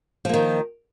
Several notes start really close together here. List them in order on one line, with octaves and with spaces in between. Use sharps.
F3 A#3 D#3